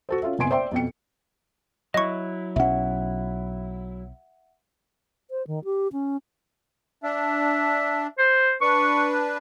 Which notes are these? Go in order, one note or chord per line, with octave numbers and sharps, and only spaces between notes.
F#4 A4 C5
C#4 F4 A4 E5
F#1 C3 B3 G#5 C6 D7
C5 D5 E5 G5 C6
F2 B2 G5 C#7
F#3 E4 D#5 C#6
B1 C#4 E5 F#5
C5
D#3
G4
C#4
D4 E5
C5
D4 B4 C#6